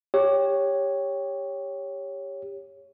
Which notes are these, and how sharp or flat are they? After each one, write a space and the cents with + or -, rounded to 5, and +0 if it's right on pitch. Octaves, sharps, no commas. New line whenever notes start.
G4 +15 C#5 +0